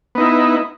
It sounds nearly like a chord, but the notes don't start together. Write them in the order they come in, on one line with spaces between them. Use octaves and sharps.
B3 D#4 E4